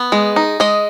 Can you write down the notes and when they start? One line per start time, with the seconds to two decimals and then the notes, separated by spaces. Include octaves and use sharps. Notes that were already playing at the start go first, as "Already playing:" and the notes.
Already playing: B3
0.12 G#3
0.36 D#4
0.60 G#3 D#5